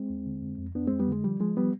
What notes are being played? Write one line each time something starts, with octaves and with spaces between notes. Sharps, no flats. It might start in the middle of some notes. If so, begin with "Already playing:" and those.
Already playing: G#3 C4
D#2
D3
F2
F2
F2 B3 D4
F2 G#3 C4
G3 B3
D3 G#3
F3 G3
F3 G#3
G3 B3